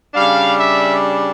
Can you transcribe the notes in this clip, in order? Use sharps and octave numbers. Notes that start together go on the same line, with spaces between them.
C#3 G3 D4 F5
E5